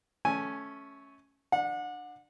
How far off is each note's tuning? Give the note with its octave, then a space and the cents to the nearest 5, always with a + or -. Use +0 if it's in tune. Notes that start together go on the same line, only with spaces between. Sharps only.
A3 -20 C#4 +0 G#5 +0
D4 +25 F#5 -30